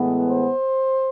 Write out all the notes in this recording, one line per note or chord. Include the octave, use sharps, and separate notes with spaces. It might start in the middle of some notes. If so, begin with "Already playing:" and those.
Already playing: A2 E3 G#3 B3
C5